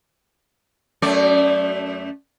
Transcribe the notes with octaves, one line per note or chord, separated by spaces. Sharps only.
F#2 A3 D5